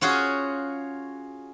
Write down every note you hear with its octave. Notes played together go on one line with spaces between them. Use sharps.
C#4 F4 F#4 G#4